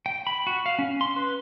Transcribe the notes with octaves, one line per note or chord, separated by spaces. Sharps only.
G5
B5
F#4
F5
C#4
C6
B4